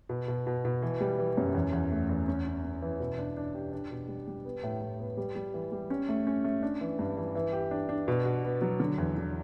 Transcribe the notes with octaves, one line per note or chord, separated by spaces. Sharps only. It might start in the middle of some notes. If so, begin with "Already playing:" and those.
B2
B2
B2
B2
E3
G3
E3
F#2
E2
E2
A3
E2
C#4
C#4
C#4
E3
B2
D4
D4
G4
D4
B2
G3
G3
B3
A2
A2
B3
G3
G3
E3
G3
C#4
A3
C#4
A3
D4
E3
G2
E3
E3
G4
D4
D4
B2
F#4
B3
F#3
D3
E2
D3